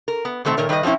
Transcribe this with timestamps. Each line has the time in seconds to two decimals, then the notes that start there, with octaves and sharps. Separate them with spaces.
0.08 A#4
0.25 B3
0.45 B2 D#3 A3 C4
0.57 A#2 D#3 A#4 C#5
0.69 D#3 G3 B4 D5 D#5
0.83 F3 F#3 C4 C#4 E4